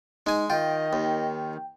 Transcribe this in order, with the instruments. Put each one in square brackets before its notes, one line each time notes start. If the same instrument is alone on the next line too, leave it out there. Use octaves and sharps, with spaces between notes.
[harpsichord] G#3 G#5 [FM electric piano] D#4
[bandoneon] D#3 [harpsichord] F4 [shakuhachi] D#5 [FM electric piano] G5
[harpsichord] D#2